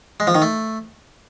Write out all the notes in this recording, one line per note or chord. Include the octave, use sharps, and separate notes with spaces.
G#3
F3
D#3
A3